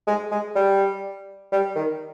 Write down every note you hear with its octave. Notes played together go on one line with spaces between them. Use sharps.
G#3
G#3
G3
G3
D#3